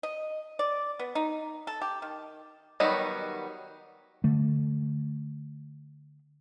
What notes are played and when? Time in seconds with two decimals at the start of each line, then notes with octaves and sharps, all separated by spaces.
0.03 D#5
0.59 D5
0.99 B3
1.15 D#4
1.67 A4
1.81 G4
2.02 D#3
2.80 D#3 F#3 G3 B3 D#4
4.24 D3 A3